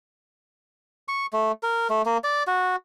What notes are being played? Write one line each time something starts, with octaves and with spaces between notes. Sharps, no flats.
C#6
A3
A#4
A3
A#3
D5
F#4